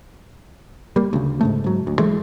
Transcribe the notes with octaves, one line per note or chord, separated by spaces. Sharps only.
G3 A#3
D2 C#3
G#2 C#3 A3
G#2 F#3
D2
E3 G#3 A3